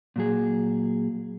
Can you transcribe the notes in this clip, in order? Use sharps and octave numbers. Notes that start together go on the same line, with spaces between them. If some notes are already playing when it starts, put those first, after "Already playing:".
A#2 F#3 G#4